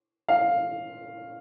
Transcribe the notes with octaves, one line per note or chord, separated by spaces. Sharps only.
F5